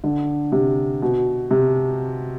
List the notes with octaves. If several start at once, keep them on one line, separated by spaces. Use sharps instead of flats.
D3
C3
B2
C3